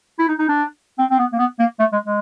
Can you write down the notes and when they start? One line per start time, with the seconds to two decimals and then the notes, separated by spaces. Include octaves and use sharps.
0.19 E4
0.28 D#4
0.39 D#4
0.49 D4
0.99 C4
1.11 C4
1.19 B3
1.32 A#3
1.39 B3
1.59 A#3
1.79 A3
1.93 G#3
2.06 G#3